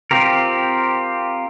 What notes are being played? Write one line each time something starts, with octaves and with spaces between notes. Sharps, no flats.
C4 F4 G4 A#4